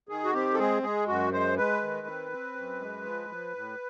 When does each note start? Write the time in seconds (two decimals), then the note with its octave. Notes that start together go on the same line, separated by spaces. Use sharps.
0.09 D#3 G#4
0.25 F#4
0.34 C4 G4
0.54 A4
0.59 G#3 G#4
0.83 G#3 G#4
1.08 F#2 F#4
1.33 G#3 C5
1.57 G#3 B4
1.82 D#3
2.07 C4
2.32 C4
2.55 F#2
2.81 G#3
3.05 F3
3.29 F3
3.55 A2